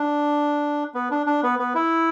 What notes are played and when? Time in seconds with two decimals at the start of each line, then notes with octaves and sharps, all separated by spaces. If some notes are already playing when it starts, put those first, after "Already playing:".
Already playing: D4
0.94 B3
1.11 D4
1.26 D4
1.43 B3
1.59 B3
1.75 E4